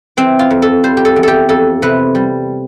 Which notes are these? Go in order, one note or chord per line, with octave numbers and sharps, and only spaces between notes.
E3 C4
F4
F2
A4
G3 C5
G4
A4
E2
G4 A4
F2 A4
C3 B4
G3